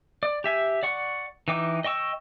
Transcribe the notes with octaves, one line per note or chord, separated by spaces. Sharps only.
D5
G4 E5 G#5
D5 F#5 C#6
E3 D#4 G5 D6
D#5 G5 C#6 E6